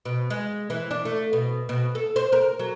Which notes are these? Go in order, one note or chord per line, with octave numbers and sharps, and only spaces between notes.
B2
G#3
E3
D4
A3
B2
B2
A4
C5
A#4
F#3